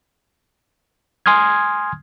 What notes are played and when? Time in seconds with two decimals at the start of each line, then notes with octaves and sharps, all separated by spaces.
1.26 G#5 C6 D#6 F6 G#6